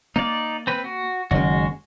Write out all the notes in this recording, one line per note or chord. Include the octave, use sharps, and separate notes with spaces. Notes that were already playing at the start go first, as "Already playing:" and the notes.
A#3 D#4 D5
C4 B4
F#4
F#1 D#3 G#3 F#4